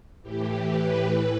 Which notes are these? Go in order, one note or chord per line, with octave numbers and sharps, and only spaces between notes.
A2 E3 G4
B4
A2 E3